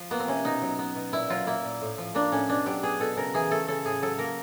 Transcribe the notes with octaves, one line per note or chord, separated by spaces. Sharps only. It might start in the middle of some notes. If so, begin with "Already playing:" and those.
Already playing: F3
A#3 B3
C4
C3 C#4
B2 D#4
F#3
B3
B2
A#2 E4
F#3 F4
A#3 E4
A#2
A2
F3
A#3 D4
A2 C#4
B2 D4
F#3 G4
B3 G#4
B2 A4
C#3 A#4
E3 G#4
A3 A4
C#3 A4
A2 G#4
F#3 A4
A#3 A#4